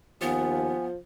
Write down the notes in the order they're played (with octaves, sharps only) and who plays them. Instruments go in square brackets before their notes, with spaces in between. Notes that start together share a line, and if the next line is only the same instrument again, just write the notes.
[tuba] D#2 [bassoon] F3 [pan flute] B3 [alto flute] G#5